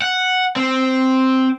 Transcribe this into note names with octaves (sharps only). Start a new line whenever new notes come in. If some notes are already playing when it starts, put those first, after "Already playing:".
F#5
C4